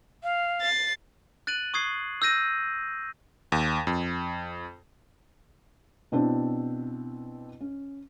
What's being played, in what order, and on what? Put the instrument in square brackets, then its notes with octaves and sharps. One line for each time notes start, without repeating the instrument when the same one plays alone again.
[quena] F5
[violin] A6 C7
[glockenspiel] F#6 A6 D7 D#7 F#7
C#6 D#6 G#6 C7
E6 G6 A#6 D#7
[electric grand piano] D#2
F2
[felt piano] B2 C4 D4 E4
C#4